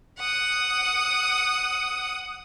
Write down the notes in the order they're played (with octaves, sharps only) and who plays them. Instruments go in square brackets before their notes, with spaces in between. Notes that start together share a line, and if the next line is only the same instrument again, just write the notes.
[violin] F#5 D#6